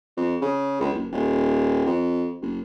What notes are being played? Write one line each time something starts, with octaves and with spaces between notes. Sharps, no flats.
F2
C#3
C#2
F#1
D#1
F2
F#1